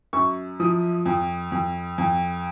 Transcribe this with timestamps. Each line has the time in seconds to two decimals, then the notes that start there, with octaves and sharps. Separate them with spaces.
0.13 F#2 C#6
0.60 F3 D#6
1.06 F2
1.52 F2
1.98 F2